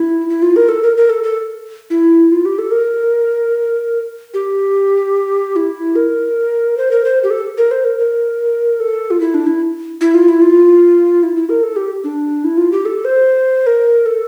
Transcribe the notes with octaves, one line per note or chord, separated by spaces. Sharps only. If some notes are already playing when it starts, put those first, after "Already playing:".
Already playing: E4
E4
F4
A#4
A4
A#4
A#4
A4
A4
E4
F4
G4
A4
A#4
G4
E4
A#4
C5
A#4
C5
G4
A4
A#4
C5
A#4
A#4
A4
F4
E4
D4
E4
E4
F4
E4
F4
E4
E4
A#4
A4
G4
D4
E4
F4
G4
A4
C5
A#4
A4